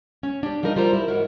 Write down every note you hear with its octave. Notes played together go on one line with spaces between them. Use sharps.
C#4
D4 G4
F3 G3 D#4 A#4 C5 D#5
G3 F4 C5 A#5
E4 A#4
D#2 G#2 E3 F#4 A#4